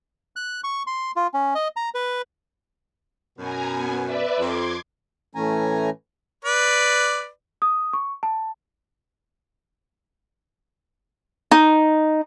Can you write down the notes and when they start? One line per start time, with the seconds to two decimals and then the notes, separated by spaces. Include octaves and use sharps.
0.36 F#6
0.64 C#6
0.87 C6
1.16 F4
1.34 C#4
1.55 D#5
1.76 A#5
1.95 B4
3.39 F#2 B2 G#5 A#5
3.73 B3 G#5
4.04 B4 D5 E5
4.40 F2 C6 D6 G#6
5.35 A2 E3 A3 C#4 G#5 A#5
6.45 B4 D5
7.62 D#6
7.93 C#6
8.23 A5
11.51 D#4